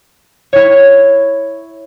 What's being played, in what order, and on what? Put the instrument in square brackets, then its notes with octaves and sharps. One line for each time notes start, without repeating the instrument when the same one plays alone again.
[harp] E4 C#5